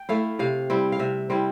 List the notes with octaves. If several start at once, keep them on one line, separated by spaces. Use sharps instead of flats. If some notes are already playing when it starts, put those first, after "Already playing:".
Already playing: G5
A3 E4 F5
C3 F5
G3 C4 E4
F5
C3 E5
G3 C4 E4 C5